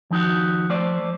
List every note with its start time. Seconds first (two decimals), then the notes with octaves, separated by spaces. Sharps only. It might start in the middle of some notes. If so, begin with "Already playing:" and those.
0.11 D#2 F3 D#4 F#4
0.70 A3 C5 D5